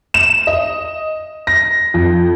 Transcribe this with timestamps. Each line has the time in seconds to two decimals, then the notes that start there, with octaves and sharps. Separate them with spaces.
0.14 E7
0.47 D#5
1.47 A#6
1.94 F2